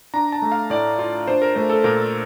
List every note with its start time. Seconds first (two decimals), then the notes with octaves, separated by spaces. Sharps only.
0.14 D4 A#5
0.32 A5
0.42 A3
0.52 F5
0.70 A2 D5
0.99 F4
1.28 D4 C5
1.42 A#4
1.55 A3 C5
1.70 A4
1.84 A#2 A#4